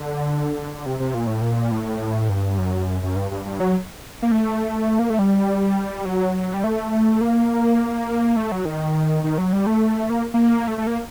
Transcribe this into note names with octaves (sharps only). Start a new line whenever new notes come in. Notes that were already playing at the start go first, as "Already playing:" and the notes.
Already playing: D3
C3
C3
A#2
A2
A#2
A2
G2
F#2
F#2
G2
G2
G2
F#3
A#3
A3
A#3
A3
G3
F#3
G3
A3
A#3
A3
F#3
D#3
D#3
F#3
G3
A3
A#3
A#3
A3
A3
A#3